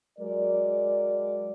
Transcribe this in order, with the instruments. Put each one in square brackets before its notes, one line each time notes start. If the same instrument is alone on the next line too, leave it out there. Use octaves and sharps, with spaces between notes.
[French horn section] F#3 G#3 A#4 D5